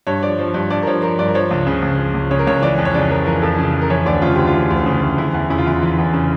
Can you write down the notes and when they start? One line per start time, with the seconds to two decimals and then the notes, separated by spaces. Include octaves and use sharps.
0.07 G2 C#5
0.23 F3 D5
0.39 F3
0.54 G2
0.70 G2 D5
0.83 A#4
0.87 F3 C#5
1.02 F3 A#4
1.19 G2 D5
1.28 A#4
1.35 F3 C#5
1.51 C#2
1.67 C#3
1.82 C#2
1.99 F3
2.14 C#2
2.31 C#3 C#5
2.39 A#4
2.47 C#2 C#5
2.62 E3 D5
2.78 F2
2.85 C#5
2.94 C#3 D5
3.10 F2 A#4
3.26 E3 A#4
3.42 F2 A4
3.59 C#3
3.74 F2
3.81 A#4
3.90 E3 C#5
4.06 D2 D5
4.22 C#3 F4
4.35 D2 G4
4.47 F4
4.54 E3
4.70 D2
4.86 C#3
5.02 D2
5.18 E3 E4
5.34 E2
5.50 C#3 E4
5.58 F4
5.66 E2 E4
5.82 E3
5.98 E2
6.14 C#3